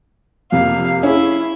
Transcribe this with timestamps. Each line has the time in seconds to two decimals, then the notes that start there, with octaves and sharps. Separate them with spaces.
0.52 F2 C3 A#3 F5
1.03 C#4 E4 G#4